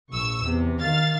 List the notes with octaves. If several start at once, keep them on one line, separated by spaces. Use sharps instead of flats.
A#1 C#6 E6
E2 C3
D#3 F5 A6